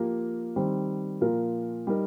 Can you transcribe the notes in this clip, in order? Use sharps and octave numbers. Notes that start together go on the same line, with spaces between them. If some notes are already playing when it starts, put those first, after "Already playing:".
Already playing: F3 A#3 G4 A#4
D#3 G3 C4
A#2 F3 A#3 F4 A#4
G3 D#4 A#4